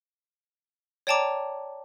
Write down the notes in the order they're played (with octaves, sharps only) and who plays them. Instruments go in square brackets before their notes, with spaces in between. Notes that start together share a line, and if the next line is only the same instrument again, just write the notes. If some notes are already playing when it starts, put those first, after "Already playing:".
[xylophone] C#5 D5 G5 A5 A#5 D6